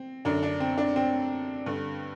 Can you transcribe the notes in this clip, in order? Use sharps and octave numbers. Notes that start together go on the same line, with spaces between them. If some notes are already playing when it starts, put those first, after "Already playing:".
Already playing: C4
F#2 D3 D4
D4
C4
D4
C4
G2 D3